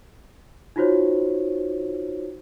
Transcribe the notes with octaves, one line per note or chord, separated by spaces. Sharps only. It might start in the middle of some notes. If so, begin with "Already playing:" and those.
D#4 F4 F#4 C5 C#5